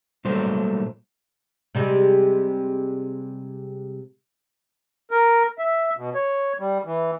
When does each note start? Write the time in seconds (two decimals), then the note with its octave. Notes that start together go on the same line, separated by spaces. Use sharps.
0.25 A#2 F#3 G3 A3 C5
1.75 C3 G3 G#3
5.11 A#4
5.59 E5
5.97 B2
6.15 C#5
6.59 G3
6.85 E3